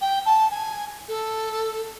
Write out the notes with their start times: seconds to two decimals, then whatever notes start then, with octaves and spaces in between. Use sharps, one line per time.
0.01 G5
0.25 A5
0.50 G#5
1.08 A4